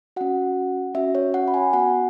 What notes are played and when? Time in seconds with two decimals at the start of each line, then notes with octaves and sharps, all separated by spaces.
0.16 C#4 F#4 F#5
0.94 C#4 F#4 E5
1.15 C#5
1.34 F#5
1.48 B5
1.54 G#5
1.73 B3 F#4 F#5